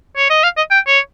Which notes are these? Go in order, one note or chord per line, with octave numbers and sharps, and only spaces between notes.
C#5
D#5
F5
D#5
G5
C#5